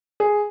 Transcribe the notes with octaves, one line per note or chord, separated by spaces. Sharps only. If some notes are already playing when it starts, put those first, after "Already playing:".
G#4